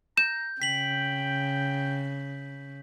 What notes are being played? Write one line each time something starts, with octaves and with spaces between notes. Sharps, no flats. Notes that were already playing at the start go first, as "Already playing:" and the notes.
A#5 G6 E7
C#3 G5 B6 F#7